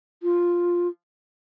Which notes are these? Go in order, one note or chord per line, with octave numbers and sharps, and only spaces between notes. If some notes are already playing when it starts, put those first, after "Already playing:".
F4